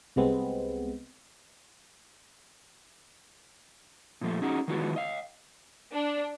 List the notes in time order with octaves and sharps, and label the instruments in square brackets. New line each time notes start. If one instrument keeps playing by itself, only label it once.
[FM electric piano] C2 C3 G#3 B3 C4
[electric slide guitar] A#2 F3 A3
C#4 D#4 F#4 G#4
D#3 E3 G#3 B3 F4 F#4
D#5 F5
[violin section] D4